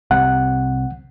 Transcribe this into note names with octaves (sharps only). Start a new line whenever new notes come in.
C2 C3 F#5